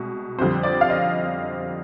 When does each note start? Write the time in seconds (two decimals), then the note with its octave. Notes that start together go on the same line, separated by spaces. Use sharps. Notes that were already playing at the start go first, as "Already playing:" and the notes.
Already playing: C2 B2 G#3
0.38 F2 D3 G3 C4 C5
0.63 D5
0.81 F5
0.90 D#5